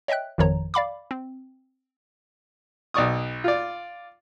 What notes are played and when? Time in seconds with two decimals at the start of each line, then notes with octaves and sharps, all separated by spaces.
0.08 C#5 D#5 E5 G5 F#6
0.38 G#1 F2 D#3 F3 C#5 A#5
0.74 D5 F5 B5 D6
1.11 C4
2.94 B1 D5 C#6 D#6
3.44 F4 D5